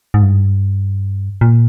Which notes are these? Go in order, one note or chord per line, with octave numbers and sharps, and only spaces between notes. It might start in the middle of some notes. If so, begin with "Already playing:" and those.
G#2
G2
A#2